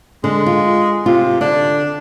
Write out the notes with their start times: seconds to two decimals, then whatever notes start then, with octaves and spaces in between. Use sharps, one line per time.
0.24 D3 G#3
0.46 F4
1.06 C3 F4
1.41 D3 D4